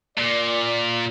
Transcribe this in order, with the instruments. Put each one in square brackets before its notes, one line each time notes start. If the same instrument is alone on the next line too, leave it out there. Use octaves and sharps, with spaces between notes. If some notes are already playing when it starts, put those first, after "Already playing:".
[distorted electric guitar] A#2 [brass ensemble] D5